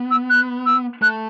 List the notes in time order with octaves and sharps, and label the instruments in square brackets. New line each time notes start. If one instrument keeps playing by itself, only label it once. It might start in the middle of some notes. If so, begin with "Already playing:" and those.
Already playing: [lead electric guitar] B3
[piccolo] E6
F#6
E6
[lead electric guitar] A3 [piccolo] F#6